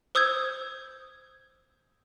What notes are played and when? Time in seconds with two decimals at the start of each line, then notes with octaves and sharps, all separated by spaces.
0.15 C5 D#6 E6 G6 G#6